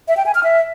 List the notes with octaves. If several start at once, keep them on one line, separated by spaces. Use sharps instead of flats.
E5
G5
G#5
F6
E5